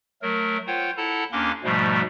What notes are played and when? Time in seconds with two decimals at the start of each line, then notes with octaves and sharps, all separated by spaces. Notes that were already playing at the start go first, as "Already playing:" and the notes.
0.22 F#3 A3 A#4
0.67 F4 C5 C#5 F#5 G5
0.97 E4 A4 F#5 A5 A#5
1.32 D#2 A#3 C#4 D4 C6 D6
1.64 G#2 B2 F3 G3 A3